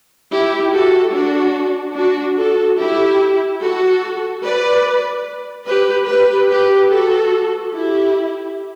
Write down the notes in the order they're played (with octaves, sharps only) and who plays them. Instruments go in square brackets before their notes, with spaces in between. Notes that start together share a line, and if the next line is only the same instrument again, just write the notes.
[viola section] E4 G4
F#4 A4
D4 F#4
D4 F#4
F#4 A4
E4 G4
F#4 A4
B4 D5
G4 B4
G4 B4
G4 B4
F#4 A4
E4 G4